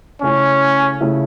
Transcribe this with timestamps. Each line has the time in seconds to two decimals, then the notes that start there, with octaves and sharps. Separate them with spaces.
0.22 C#3 A3 C#4 E4
1.01 C#3 A3 E4